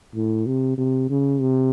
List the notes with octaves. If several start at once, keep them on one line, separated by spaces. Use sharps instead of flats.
A2
C3
C3
C#3
C3